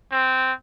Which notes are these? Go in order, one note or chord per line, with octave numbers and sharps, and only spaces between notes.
C4